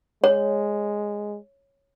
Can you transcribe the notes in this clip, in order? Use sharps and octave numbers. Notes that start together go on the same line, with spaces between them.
G#3 C#5